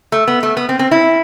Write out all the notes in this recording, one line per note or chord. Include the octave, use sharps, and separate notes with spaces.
A3
B3
A3
B3
C4
C4
E4